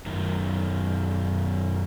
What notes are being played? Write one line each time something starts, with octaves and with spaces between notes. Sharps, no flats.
F#2 D#3